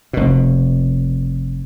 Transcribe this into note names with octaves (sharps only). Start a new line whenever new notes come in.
F1 B2